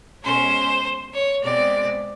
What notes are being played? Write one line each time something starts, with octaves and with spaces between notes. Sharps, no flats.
B2 G#3 C#4 C5
C#5
B2 G#3 C4 D5